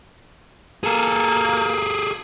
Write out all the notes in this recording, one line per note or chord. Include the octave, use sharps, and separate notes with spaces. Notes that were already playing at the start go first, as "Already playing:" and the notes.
A#3 G#4 A4